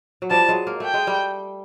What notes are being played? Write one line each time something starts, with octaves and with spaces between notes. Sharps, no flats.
F#3
F3 G3 A5
F#3 G#3
A#3
A3 G5
G#3
G3 A3